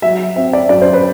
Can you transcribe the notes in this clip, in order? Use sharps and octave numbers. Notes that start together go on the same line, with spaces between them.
F#3 E5
C4 E5
D5
F#2 D5
C5
B4